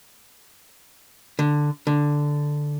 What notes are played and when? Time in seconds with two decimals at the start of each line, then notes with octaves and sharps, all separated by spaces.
1.39 D3
1.87 D3